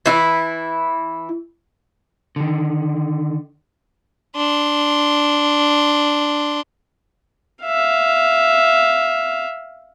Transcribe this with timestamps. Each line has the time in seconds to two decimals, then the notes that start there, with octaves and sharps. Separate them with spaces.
0.06 E3 E4
2.36 D3 D#3
4.36 D4 C6
7.65 E5 F5